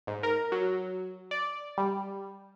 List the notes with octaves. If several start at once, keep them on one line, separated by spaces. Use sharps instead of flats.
G#2
A#4
F#3
D5
G3